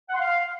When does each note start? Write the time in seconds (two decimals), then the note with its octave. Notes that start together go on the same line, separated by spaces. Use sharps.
0.09 F#5
0.14 C6
0.19 F5